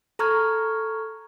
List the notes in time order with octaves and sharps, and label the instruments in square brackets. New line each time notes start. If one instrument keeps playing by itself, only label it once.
[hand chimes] A4 A#5 C#6 F6 G#6